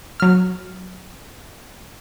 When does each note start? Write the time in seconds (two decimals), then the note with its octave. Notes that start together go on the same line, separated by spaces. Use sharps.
0.20 F#3 F6